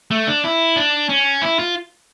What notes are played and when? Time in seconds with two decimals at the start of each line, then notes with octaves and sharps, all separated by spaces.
0.11 A3
0.27 D4
0.44 E4
0.76 D4
1.09 C#4
1.42 E4
1.59 F4